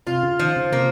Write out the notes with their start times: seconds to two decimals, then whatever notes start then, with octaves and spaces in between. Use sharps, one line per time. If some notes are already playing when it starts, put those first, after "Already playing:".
0.07 C3 F4
0.23 C#3
0.40 D#3 F3
0.57 C#3
0.72 C3 A#3